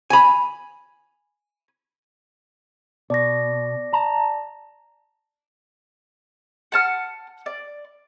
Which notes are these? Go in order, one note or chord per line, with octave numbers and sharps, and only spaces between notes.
G#5 B5
B2 D5 A#6
A5 A#5
F#5 A5 F6
D5